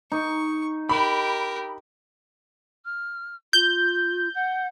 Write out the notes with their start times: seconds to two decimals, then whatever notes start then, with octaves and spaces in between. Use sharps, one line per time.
0.12 D#4 C#6
0.89 G4 A#4 B5
2.85 F6
3.53 F4 G6
4.35 F#5